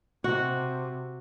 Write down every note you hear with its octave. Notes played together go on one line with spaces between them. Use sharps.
C3 F#4